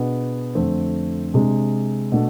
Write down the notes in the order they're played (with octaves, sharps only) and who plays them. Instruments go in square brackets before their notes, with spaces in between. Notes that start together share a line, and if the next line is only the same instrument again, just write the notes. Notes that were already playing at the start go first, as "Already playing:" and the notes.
Already playing: [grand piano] B2 B3 D4 G#4
F2 D3 A3 C4
C3 G#3 D4
B2 A3 D4 A4